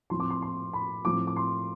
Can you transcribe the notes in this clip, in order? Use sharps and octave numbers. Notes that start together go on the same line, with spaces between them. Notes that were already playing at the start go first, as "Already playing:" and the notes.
A2 F3 C4 C6
D6
C6
C6
B5
A2 F3 A3 C4 D6
D6
C6